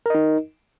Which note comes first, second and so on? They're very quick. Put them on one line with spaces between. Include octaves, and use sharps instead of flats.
A#4 D#5 D#4